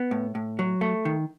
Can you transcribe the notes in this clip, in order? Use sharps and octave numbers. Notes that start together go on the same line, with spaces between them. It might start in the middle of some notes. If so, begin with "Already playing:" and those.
Already playing: B3
A2
A2
F#3
A3
D#3